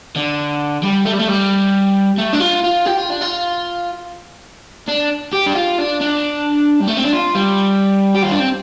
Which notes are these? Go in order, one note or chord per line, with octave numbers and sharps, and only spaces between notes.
D3
G3
A3
G3
A3
G3
A3
D4
F4
F4
G4
F4
D4
F4
D4
G4
D4
F4
D4
D4
G3
A3
C4
D4
F4
G3
G4
F4
D4
C4